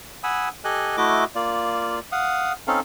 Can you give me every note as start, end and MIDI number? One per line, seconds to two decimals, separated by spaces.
0.24 0.49 78
0.24 0.49 80
0.24 0.49 83
0.24 0.49 87
0.24 0.49 88
0.64 0.96 67
0.64 0.96 69
0.64 0.96 75
0.64 0.96 80
0.64 0.96 90
0.97 1.24 57
0.97 1.24 64
0.97 1.24 66
0.97 1.24 75
0.97 1.24 86
1.35 1.99 58
1.35 1.99 65
1.35 1.99 74
2.12 2.53 77
2.12 2.53 78
2.12 2.53 87
2.67 2.80 60
2.67 2.80 61
2.67 2.80 63
2.67 2.80 69
2.67 2.80 77